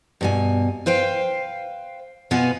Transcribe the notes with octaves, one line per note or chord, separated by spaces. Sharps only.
G2 B2 G#5
B4 C5 F5 G5
B2 B3 F4 F#5 G#5